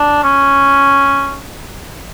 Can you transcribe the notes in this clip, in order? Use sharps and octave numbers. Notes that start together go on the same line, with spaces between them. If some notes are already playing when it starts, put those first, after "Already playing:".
Already playing: D4
C#4